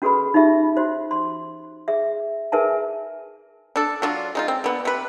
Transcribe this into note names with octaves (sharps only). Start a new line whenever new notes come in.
C#4 F#4 G#4 A4 B4 B5
D#4 F4 G4 E5
F#4 C5
C6
G#4 E5
G#4 A#4 B4 E5 G#5 A5
D4 A4
F#3 D4 F4
G#3 D#4 F4
C4
D3 B3
C3 B4